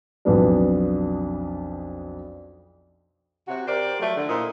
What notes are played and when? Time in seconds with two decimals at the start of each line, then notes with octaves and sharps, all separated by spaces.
0.25 B1 F2 B3 D4
3.48 C3 F#4
3.67 G4 A#4 C5 D5
4.00 F3 F#3 A3
4.17 D3
4.29 A#2 A#3 E4 C5 D#5